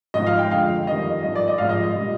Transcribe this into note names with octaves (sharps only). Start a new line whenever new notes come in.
G#1 G#2 F3 D#5
F5
G5
F2 D3 G#3 F5
F2 D#3 G3 D#5
G#1 G2 F3 D#5
D5
D#5
G#1 G#2 F3 G#3 F5
D#5
A#2 G3